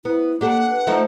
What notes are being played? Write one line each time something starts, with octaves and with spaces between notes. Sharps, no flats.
B3 E4
A#3 D4 G4 A4 F#5
B4
F3 A3 D#4